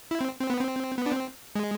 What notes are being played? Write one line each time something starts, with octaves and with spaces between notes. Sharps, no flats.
E4
C4
C4
B3
C4
B3
D4
C4
G#3